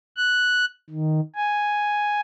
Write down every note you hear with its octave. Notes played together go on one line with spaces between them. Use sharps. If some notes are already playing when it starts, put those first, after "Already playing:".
F#6
D#3
G#5